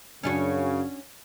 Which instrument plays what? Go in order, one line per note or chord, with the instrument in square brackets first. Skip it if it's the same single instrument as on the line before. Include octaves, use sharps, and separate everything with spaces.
[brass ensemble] F#2 C#3 [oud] C#4 D4 F#4